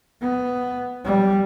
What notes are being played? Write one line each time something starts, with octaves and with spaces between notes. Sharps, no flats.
B3
G3